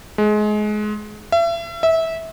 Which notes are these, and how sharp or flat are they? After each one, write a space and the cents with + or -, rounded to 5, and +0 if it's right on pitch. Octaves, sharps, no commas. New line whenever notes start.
G#3 +25
E5 +40
E5 -20